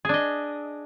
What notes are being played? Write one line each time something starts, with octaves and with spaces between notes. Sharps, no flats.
D4 G#4 D#5